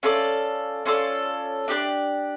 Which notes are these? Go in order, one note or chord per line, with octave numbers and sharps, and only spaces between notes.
C#4 F4 A4 D5
C#4 F4 A4 D5
D4 G4 B4 D5